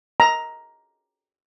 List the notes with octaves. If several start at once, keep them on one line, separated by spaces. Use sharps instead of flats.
A#5